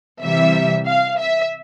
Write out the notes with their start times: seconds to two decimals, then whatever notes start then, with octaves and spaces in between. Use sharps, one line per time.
0.23 C3 E3 G3 E5
0.87 F5
1.19 E5